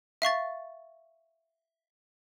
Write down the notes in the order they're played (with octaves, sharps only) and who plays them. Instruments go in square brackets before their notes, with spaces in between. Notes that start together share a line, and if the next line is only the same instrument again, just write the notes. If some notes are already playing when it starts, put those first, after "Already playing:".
[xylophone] E5 F5 C#6 A6